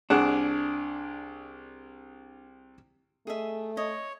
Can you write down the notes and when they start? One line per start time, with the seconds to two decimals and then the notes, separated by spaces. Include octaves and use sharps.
0.10 C2 D4 G#4 F#5
3.27 A3 G#4 D#5 E5
3.77 C#5 D#5